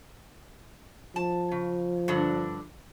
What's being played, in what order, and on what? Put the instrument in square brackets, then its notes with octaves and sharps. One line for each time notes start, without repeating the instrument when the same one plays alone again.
[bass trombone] F3 [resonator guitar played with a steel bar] A5
[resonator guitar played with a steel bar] C#3
G2 D3 D4